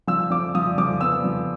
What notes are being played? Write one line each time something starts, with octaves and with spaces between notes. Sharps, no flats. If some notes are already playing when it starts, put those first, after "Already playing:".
F3 E6
F3 D6
F3 D#6
F3 D6
B3 E6
F3